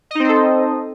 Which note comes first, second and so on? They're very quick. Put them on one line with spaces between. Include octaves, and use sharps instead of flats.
D#5 D#4 C4 C5 A4